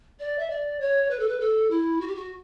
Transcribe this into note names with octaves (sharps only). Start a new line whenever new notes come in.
D5
E5
D5
C#5
B4
A4
B4
A4
E4
F#4
G4
F#4